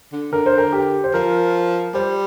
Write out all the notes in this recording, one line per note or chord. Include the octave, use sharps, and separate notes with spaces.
D3
D3 A#4
C5
A#4
G4
C5
F3 A#4
G3 C5